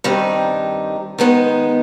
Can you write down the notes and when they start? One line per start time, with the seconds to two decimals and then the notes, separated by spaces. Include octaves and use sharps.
0.04 G2 D#3 G3 C4 D#4
1.19 D#3 G#3 B3 D#4